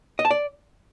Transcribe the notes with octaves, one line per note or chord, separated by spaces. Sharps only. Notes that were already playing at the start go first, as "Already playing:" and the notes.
D#5
A5
D5